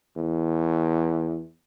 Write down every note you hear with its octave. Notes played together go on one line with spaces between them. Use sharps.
E2